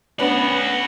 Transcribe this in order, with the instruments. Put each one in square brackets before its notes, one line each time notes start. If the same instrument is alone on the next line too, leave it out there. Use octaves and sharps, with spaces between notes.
[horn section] B3 [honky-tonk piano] C#4 D4 B4 [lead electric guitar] F#4 D5